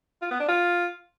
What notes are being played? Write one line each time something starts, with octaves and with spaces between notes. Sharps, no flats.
F4
B3
D4
F4